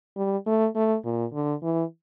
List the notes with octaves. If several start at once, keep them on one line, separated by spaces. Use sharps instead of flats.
G3
A3
A3
A#2
D3
E3